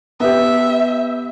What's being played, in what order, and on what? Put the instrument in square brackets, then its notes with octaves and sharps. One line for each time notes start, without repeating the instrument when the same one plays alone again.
[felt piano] B3 G4 [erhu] E5